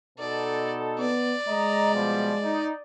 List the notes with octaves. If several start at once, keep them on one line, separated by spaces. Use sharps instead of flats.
B2 D#4 A4 D5
B3 D5
G#3 D#5 A#5
B2 F3 G3
D#4